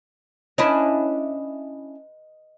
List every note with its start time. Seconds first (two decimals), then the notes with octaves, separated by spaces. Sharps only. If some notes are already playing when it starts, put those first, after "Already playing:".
0.58 C#4 D4 E4 B4 D#5